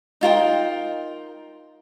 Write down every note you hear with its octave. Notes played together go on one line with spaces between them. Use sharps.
D#4 F4 A#4 G5